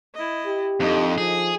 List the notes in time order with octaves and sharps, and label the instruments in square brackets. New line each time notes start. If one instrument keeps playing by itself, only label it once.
[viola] E4 D#5
[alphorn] G4
[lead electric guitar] F2 [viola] D3 D#4
[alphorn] F3 [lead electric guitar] G#4